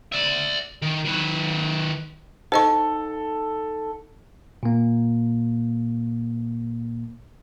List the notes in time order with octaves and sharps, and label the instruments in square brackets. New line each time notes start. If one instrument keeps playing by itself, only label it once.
[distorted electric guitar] D5 E5
D#3
D#3 B4
[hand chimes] D#4 F#5 [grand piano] A4 [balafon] C5 D#5 C#6
[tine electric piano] A#2 A#3